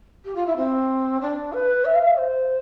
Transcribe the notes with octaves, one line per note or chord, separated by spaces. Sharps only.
G4
F4
E4
C4
D4
B4
E5
F5
E5
C5